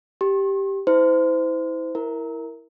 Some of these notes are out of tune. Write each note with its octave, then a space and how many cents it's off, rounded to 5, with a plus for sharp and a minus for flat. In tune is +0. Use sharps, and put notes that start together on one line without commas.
G4 +0 C6 +45
E4 -30 C5 -30
E4 -5 A#4 +0